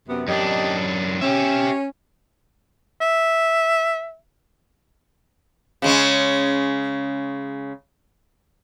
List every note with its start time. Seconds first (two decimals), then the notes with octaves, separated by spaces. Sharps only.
0.09 F#2 C3 B3
0.28 F#2 D4 G4 D#5
1.21 C#4 G4 E5
3.01 E5
5.82 C#3 G#3 C#4